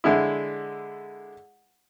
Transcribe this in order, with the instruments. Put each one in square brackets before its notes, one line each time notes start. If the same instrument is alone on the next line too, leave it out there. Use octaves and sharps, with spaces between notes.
[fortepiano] D3 G#3 E4